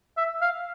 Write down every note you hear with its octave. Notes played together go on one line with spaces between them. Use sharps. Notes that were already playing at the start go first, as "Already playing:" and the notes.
E5
F5